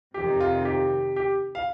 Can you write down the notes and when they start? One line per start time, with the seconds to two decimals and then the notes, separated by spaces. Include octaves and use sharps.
0.14 F2 C3 D#3 G4
0.40 F4
0.65 G4
1.16 G4
1.55 F5